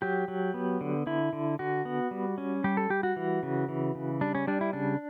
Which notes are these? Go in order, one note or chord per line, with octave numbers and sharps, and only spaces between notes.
F#3 G4
F#3
B3
D3
D3 E4
D3
D3 F#4
B3
G3
C#4
G3 G4
A4
G3 G4
F#4
E3
C#3
E3
C#3
G3 D4
C#4
G3 D4
E4
C#3 D4